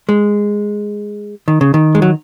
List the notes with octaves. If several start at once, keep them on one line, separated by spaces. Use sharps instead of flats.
G#3
D#3
C#3
D#3
G#3
F#3